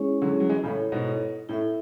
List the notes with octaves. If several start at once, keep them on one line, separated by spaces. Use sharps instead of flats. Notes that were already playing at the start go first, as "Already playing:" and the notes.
Already playing: G#3 C#4 E4 G#4 C#5
D3 F#3
F#3
E3 G#3
A2 C#3 E4 A4 C#5
G#2 B2
A2 E4 A4 E5